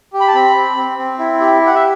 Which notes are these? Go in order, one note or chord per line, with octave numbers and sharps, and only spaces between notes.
G4
B5
A5
C4 B5
C4
C4
C4
E4
G4
G4
F#5
E5